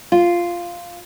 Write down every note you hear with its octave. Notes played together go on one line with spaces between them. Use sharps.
F4